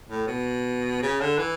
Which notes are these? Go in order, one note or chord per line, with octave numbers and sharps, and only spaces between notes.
A2
B2
C#3
D3
E3